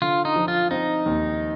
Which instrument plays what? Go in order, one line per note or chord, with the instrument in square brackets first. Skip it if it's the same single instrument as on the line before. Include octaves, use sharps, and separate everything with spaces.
[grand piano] D3 [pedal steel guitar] F4
[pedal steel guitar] D#4
[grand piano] F3
[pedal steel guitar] F4
[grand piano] C4 [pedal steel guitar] D#4
[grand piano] D#2